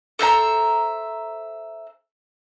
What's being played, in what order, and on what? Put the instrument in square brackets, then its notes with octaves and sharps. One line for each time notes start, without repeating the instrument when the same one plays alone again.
[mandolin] A4 C5 E5 A#5